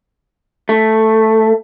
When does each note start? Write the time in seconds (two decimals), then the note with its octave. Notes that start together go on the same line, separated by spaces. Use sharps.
0.69 A3